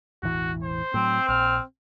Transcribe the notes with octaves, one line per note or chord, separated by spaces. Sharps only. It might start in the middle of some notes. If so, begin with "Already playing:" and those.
E1 A1 E3 F#4
C5
A2 F#3 C4
A#1 F6